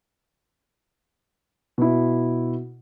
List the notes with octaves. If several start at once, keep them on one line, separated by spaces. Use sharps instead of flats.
B2 E4